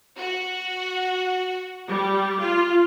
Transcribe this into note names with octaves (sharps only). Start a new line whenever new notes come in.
F#4
G3
F4